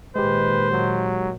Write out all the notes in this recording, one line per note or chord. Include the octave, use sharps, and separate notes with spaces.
A#2 D#3 G#3 G4 B4 C5
F#3